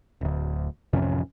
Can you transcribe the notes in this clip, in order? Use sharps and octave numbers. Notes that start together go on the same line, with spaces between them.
D1 D2
A1 F2 C3 C#4